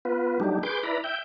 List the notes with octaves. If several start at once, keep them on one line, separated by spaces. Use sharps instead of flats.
B3 F4 B4
F#3 G3 A3 D4 D#4 G4
G#4 B4 C6 D6 G6
E4 B4 D5 A#5 B5
E5 G5 G6